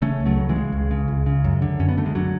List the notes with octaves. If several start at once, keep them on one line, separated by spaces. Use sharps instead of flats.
C#3 A3 C#4
C#2
F#3 A3
C#3
E3 G#3
C#3
C#2
C#3
C#2
C#3
F#2
D3
F#2 C#4
B3
D3 A3
G#3
D3 F#3